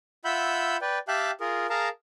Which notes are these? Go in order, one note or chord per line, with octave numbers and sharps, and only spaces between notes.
F4 E5 F#5 B5 E6 G6
B4 D5 G5
G4 E5 F5 G5 A5 F#6
F4 G#4 A#4
G#4 A#4 F5 A5 A#5